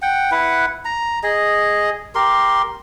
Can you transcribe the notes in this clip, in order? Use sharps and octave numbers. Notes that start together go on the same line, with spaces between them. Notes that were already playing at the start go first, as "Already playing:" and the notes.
F#5 G5
E4 B4 F#5
A#5
G#4 D#5
G4 A#4 C6